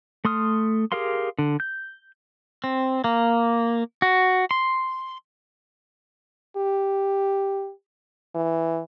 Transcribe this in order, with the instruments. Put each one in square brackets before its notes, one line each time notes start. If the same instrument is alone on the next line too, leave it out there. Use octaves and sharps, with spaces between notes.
[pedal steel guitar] A3 C6 D#6 F6
G4 G#4 A#4 F5 C6
D3
G6
C4
A#3
F#4
C6
[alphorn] G4
E3